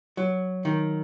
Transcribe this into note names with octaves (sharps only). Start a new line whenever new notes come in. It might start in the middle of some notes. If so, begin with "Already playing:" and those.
F#3
D#3